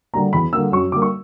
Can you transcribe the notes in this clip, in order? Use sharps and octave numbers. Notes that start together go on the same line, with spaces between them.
D3 G3 A#3 A#5
E2 B5
D3 G3 A#3 E6
F#2 C#6
D3 G3 A#3 D6
C#6